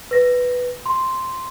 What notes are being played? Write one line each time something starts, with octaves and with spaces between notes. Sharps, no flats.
B4 A#6
C6